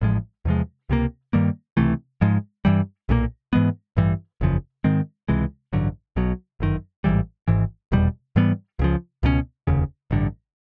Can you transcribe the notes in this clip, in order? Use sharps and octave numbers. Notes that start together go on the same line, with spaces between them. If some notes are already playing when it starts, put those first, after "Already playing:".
A1 A2 F3 G#3
E2 C3 F3 G#3
C#2 C3 F3 A#3
G2 D#3 G3 A#3
C#2 C3 E3 A3
G#2 F3 G#3
G2 E3 G3
B1 A#2 G3 A#3
G#2 E3 G#3 B3
A1 G2 E3 G3
F#1 E2 C#3 F3
G#2 D#3 G#3 C4
C#2 C3 E3 G#3
A1 G2 D3 F#3
B1 B2 F#3
G1 F#2 D#3
A1 G#2 E3 G3
G#1 G#2 E3
F1 E2 B2 G3
G#2 E3 G3 B3
C#2 C#3 F3
C#2 B2 G#3 C#4
F1 D#2 C#3
A1 G2 D3